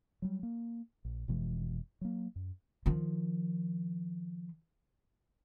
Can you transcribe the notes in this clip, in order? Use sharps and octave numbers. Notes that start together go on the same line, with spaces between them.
F#3 G3
A#3
A#1
F1 B2 E3 G#3
F#3 A#3
F#2
D#3 F3